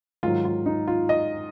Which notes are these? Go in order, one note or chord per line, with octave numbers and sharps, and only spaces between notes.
G#2 D#3 F#3 F4
F4
D#4
F4
D#5